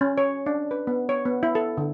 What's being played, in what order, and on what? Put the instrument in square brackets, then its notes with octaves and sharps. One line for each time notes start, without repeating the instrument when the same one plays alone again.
[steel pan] C#4
C#5
D4
B4
B3
C#5
B3
E4
A4
D3